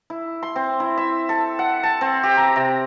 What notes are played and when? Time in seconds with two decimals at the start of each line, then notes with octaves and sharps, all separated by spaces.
0.10 E4
0.43 C6
0.56 C4
0.80 E4
0.97 E5
1.29 A4
1.59 F#5
1.83 A5
2.01 C4
2.23 G4
2.37 A#5
2.56 C3